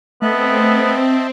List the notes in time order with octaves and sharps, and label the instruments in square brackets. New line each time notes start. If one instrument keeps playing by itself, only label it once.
[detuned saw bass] A3 [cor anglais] B3 [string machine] C4 [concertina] D#5 E5 A5